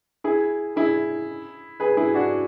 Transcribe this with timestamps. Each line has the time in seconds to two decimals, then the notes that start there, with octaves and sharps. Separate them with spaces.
0.24 E4 G#4
0.76 E4 G#4
1.80 G#4 B4
1.97 E4 G#4
2.14 D4 F#4